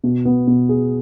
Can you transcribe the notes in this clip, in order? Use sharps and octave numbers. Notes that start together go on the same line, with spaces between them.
B2
B3
B2
G#4